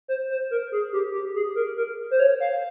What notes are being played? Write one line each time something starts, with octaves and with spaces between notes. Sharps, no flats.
C5
C5
A#4
G#4
G4
G4
G#4
A#4
A#4
C5
C#5
F5